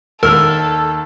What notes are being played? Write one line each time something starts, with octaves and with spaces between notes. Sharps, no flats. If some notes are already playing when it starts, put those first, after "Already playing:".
D#2 A4 A#4 E6 F6